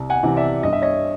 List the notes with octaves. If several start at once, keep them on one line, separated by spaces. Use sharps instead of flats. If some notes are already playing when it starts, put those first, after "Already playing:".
Already playing: C2
F#5 G#5
C3 E3
D5 E5
G2 D#5
E5
C#5 D#5